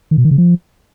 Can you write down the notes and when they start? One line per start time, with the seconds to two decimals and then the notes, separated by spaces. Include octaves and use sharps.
0.11 D#3
0.18 B2
0.25 D#3
0.31 C#3
0.38 F3